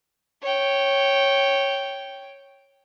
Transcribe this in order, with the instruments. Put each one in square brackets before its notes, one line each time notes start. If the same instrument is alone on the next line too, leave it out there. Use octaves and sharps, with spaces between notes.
[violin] C#5 G5